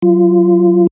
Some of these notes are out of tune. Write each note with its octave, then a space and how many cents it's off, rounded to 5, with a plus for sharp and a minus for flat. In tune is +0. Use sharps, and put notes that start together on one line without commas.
F#3 +0 F4 -20